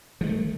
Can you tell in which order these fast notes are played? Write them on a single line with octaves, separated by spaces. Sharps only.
F3 G#3 D#3 A3